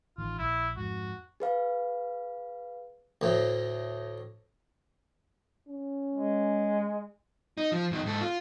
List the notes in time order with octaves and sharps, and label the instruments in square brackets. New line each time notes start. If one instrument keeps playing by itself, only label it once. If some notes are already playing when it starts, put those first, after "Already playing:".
[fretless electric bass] A1 D#3 [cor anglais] F4
[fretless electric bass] A#1 [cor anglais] E4
[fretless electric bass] F2 G#2 [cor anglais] F#4
[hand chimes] G#4 B4 F5
[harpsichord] D2 A2
[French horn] C#4
[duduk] G#3
[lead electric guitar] D#4
F3
F#2 D#3
G#2 A4
F4